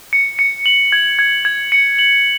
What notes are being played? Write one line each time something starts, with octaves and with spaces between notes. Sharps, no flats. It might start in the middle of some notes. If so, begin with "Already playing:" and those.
C#7
C#7
F#7
G#6
G#6
G#6
C#7
F#7